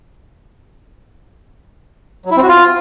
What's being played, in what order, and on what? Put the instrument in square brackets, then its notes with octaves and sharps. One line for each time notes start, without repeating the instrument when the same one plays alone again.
[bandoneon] F#3
E4
C4
F#4
F4